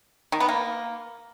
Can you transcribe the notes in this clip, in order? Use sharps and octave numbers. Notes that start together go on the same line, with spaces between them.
D#3
B3
A#3